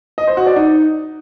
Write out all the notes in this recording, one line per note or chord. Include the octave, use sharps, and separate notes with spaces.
D#5
C5
F#4
D5
D#4